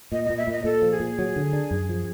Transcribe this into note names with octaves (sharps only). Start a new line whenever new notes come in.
A#2 D#5
D#5
A#2
E5
A#2 D#5
A#2 A4
F3
G#4
A#2
F#3
D3
D4
F#2
F3